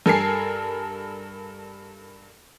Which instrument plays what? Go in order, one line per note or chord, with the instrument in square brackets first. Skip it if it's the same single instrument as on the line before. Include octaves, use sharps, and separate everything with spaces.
[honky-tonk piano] G2 A4 A#4 G#5 C7